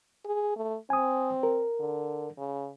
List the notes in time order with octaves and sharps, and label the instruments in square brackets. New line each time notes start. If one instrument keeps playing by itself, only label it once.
[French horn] G#4
A3
[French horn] C4 [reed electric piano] G#5 D#6
[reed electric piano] A#4
[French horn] D3
C#3